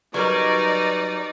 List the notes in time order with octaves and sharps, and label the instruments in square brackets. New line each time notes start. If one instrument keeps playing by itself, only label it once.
[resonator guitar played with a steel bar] F#3 G3 A#4 [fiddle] D#4 [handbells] B4 C#6 [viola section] D5